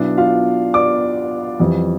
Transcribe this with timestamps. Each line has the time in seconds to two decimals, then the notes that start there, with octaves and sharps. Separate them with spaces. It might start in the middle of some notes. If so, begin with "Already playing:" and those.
Already playing: B1 B2 B3 D4 E4 D5
0.18 F4 F5
0.74 D5 D6
1.59 F2 E3 G3